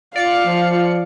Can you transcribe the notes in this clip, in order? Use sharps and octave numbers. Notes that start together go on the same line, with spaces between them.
F4 D5 F5 C#7
F3